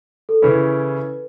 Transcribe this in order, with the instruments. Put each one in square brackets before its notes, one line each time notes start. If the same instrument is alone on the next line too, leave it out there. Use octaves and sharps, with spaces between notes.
[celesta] A4
[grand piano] C#3 E3 C#4 E4 [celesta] B4